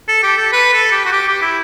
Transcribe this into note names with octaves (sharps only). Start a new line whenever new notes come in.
A4
G4
A4
B4
A4
G4
F#4
G4
G4
E4